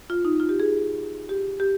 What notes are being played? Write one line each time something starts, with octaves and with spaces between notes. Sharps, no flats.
F4
D#4
F4
G4
G#4
G4
G4